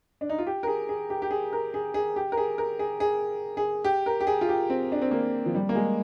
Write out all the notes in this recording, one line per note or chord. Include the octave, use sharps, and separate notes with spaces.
D4
D#4
F4
G4
A#4
G#4
G#4
G4
G4
G#4
A#4
G#4
G#4
G4
A#4
G#4
A#4
G#4
G#4
G#4
G4
A#4
G4
G#4
F4
G4
C4
D4
C4
A#3
F3
G3
A#3
G#3